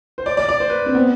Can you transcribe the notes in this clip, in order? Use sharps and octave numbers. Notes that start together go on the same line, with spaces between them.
C5
D5
D5
D5
C5
B4
C4
B3